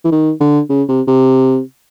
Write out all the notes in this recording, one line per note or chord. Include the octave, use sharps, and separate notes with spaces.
E3
D#3
D3
C#3
C3
C3